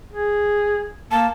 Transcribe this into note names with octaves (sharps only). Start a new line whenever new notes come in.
G#4
A#3 A5